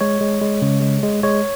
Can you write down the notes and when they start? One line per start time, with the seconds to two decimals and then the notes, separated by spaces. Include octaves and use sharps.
0.01 G#3 C#5
0.21 G#3
0.42 G#3
0.62 C#3
0.82 G#3
1.03 G#3
1.23 G#3 C#5